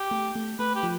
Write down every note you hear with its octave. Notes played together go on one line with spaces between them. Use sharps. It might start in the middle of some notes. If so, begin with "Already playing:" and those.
Already playing: G4
A3
A3
A3 B4
G4
F3